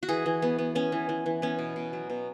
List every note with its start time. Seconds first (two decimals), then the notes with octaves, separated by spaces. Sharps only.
0.03 F#4
0.09 E3 G#4
0.26 E3
0.42 B3
0.58 B3
0.75 B3 C#4
0.92 E3
1.09 E3
1.26 E3
1.42 B3 C#4
1.59 B2
1.76 B2
1.93 F#3
2.10 B2